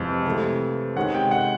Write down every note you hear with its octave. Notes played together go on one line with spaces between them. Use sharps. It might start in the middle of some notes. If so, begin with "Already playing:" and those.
Already playing: F2 C3 E3 G#3
C3 E3 A3
C3 D#3 G#3 C#4 F#5
G5
F#5